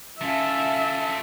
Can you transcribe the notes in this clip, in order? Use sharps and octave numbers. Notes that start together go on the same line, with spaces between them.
A3 C#4 F4 E5 A5